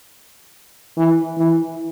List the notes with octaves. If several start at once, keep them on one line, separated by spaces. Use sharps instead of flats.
E3
E3